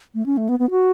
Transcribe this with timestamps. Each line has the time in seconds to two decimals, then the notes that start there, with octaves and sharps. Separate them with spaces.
0.15 A3
0.26 C#4
0.37 A3
0.49 B3
0.59 B3
0.70 F#4